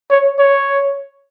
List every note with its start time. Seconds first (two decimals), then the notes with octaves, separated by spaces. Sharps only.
0.10 C#5
0.39 C#5